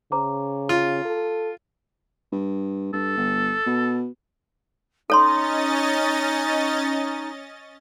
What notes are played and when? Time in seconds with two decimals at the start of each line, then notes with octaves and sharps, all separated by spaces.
0.12 C#3 C5 A#5 D6
0.69 F4
1.05 A4
2.32 G2
2.93 G2 A4
3.17 G1
3.66 B2
5.10 C#4 D#4 A4 C#5 D#5 C6 A6